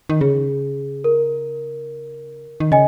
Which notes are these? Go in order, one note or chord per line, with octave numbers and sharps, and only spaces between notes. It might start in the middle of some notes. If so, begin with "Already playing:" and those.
D#3
C#3 G#4
A#4
D#3
C#3 D#5 G#5